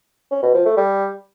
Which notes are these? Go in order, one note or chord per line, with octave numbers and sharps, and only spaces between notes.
C#4
B2
F3
A3
G3